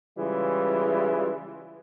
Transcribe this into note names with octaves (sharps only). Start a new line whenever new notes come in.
C#3 E3 G3 G#3 E4 F4